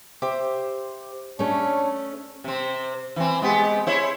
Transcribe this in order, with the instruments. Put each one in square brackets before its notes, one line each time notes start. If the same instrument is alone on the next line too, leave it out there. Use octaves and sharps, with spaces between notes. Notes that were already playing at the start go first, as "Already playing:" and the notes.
[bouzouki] G4 C5 E5
[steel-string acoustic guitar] A3 C#4 [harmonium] D4 C#5
[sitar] C3 C4
E3 C4
G#3 B3 G4
E4 C5 C#5